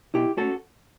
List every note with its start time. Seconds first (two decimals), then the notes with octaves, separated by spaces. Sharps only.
0.14 B2 E4 G4
0.37 A3 C#4 F#4 A4